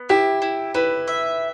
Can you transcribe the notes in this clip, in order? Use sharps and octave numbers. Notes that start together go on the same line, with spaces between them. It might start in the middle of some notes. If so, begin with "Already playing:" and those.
Already playing: B3
E4 G4
E4
E4 B4
E5